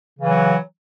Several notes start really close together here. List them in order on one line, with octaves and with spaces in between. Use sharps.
C#3 E3 F#3